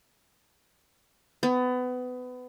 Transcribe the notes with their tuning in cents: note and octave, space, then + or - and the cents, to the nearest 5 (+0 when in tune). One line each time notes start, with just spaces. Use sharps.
B3 +25